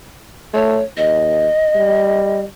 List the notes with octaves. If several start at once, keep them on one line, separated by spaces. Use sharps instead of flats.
A3 C#5
D#2 D#5
G3